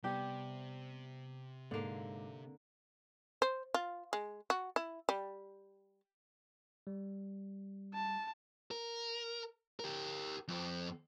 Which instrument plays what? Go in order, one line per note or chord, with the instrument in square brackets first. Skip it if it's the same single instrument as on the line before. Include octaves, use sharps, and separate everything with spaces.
[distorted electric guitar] C3 [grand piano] G3 B3 [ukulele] G4
[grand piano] G#2 D6 [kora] D3 A#3
[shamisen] C5
F4
G#3
F#4
E4
G3
[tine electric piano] G3
[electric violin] A5
[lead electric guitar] A#4
G4 A#4
F2 C4